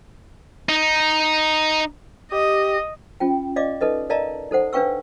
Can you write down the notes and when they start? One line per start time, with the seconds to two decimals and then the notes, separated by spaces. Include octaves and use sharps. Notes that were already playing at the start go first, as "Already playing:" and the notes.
0.69 D#4
2.32 G4 D#5
3.20 C#4 F4 G5
3.56 D5 D#5 F5 D6
3.81 D#4 A4 B4 D#5
4.10 A#4 D5 D#5 F5 A5 A#5
4.51 D#4 A4 C5 F#5
4.73 D4 B4 F5 G5 C#6 E6